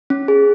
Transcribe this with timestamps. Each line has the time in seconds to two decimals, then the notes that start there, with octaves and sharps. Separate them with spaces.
0.10 C#4
0.28 G#4